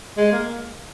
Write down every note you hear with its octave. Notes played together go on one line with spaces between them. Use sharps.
G#3
A#3